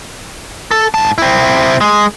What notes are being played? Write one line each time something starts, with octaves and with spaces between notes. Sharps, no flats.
A4
G#2 A5
C4 E4
G#3